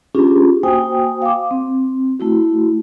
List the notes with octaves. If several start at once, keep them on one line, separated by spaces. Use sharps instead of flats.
C#4 D4 F4 G4 G#4
A#3 F#4 C5 G5 G#5 D#6
F5 D6
C4
A3 E4 F#4